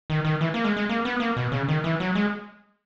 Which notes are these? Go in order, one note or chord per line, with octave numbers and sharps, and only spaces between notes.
D#3
D#3
E3
A#3
G#3
G#3
A#3
B3
A#3
B2
C#3
D#3
E3
F#3
G#3